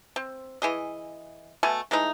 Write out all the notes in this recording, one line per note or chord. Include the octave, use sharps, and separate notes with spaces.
C4
E3 G#4 D#5
B2 A3 G#5
E3 G#3 A3 D#4